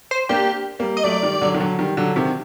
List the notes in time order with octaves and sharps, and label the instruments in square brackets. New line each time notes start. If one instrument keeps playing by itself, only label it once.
[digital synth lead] C5
[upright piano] A#3 D4 [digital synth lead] G4
[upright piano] G3 A#3
[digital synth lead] D#5
[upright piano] F#3 A3 [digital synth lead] D5
[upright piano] D#3 G3
D3 F#3
D#3
D3 F#3
D#3 G3
D3 F#3
C3 D#3